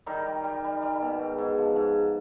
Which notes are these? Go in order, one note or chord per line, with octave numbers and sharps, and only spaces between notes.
D#3 G3 D#4
G3
G3
G3
G3
B2
G#2
G#2
F3
G#2